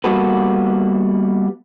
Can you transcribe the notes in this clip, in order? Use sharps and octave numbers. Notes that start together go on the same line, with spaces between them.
G3 A#3 B3 F#4 A4 B4